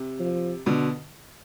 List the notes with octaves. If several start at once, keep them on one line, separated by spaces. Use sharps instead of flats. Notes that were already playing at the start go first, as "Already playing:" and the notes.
Already playing: C3
F3
B2 D3